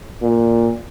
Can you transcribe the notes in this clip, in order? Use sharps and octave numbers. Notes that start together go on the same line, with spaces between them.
A#2